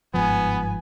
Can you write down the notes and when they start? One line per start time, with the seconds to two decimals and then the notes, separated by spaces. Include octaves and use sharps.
0.14 G1 G#2 F3 B3 G#5